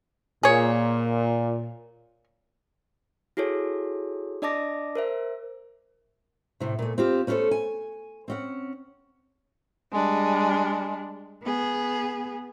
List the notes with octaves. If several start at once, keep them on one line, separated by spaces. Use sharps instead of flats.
A#2 G#4 C#5
E4 F#4 G#4 A4 C#5
D4 D5 D#5 A5 D6 A#6
A#4 C5 E5
A2 C3
A#2 A3
C4 F4 G4
A3 C#4 E4 G4 A4 C5
G#5
C4 C#4 F#5
G3 G#3 D4
B3 G#4